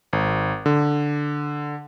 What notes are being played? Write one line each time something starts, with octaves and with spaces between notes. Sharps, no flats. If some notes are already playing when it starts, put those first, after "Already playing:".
G#1
D3